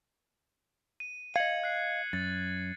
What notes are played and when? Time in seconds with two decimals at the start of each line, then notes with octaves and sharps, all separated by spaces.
1.00 D#7
1.36 D#5 F5 G#6 C#7 F#7
1.63 F#6 C7
2.13 F#2 A6